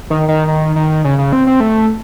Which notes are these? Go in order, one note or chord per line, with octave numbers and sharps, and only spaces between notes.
D#3
D#3
D#3
D#3
C#3
C#3
C4
C4
A3